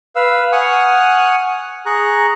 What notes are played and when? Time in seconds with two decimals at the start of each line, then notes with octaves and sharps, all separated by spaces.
0.16 B4 F5 E6
0.52 F#5 G#5 C#6 D#6 F6 F#6
1.86 G#4 A#5 C#6 F#6